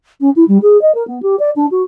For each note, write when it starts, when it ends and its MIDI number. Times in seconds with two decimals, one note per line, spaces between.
0.21 0.30 61
0.36 0.44 64
0.48 0.58 55
0.62 0.80 68
0.82 0.94 75
0.95 1.06 70
1.07 1.21 59
1.23 1.36 67
1.39 1.50 74
1.56 1.66 62
1.71 1.83 66